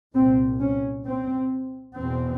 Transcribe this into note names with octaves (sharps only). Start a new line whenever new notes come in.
C2 A#2 C4
C#4
C4
E2 B2 C4